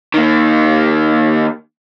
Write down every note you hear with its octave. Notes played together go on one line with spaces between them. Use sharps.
D#3 A#3